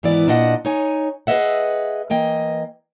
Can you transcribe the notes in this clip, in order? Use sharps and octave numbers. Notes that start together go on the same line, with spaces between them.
G#2 D#3 E3 B3 E4 D5
A#2 D4 D#5 F#5
D#4 C#5 G#5
G#4 B4 C#5 D#5 E5 F#5
E3 A#3 D#5 G5